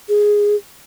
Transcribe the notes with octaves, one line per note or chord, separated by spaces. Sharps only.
G#4